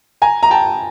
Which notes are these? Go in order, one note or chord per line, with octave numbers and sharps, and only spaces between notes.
G#5 A#5
A#5
G5 A5